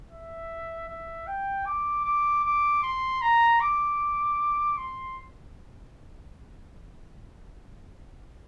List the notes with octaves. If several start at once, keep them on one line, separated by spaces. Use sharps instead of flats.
E5
E5
G5
D6
D6
D6
C6
A#5
D6
C6